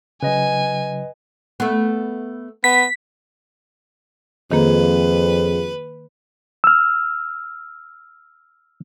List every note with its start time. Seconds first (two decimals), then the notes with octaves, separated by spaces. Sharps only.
0.22 C#3 F#3 B4 D#5 G#5
1.60 A3 B3
2.64 B3 B6
4.52 F2 D#3 A#3 G#4 B4
6.64 E6 F6